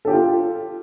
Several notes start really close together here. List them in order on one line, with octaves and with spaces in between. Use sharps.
A4 G4 G5 F4